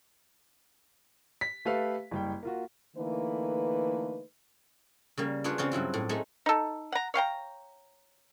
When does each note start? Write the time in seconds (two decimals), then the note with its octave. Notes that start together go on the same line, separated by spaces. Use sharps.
1.41 B6
1.65 A3 G4 A4 B4 E5 F5
2.11 F#1 G3 G5
2.43 A#3 F4 F#4
2.97 D3 E3 A3 A#3 D#4 B4
5.17 C#3 G3 A#3
5.44 D4 F4 G#4 B4 C#5
5.58 C#3 C4 F4 C#5
5.72 G2 F#3 E4 F4
5.94 A2
6.09 G#3 A3 D#4 G#4
6.46 D#4 A4
6.92 F#5 A#5
7.14 C#5 F5 G5 A#5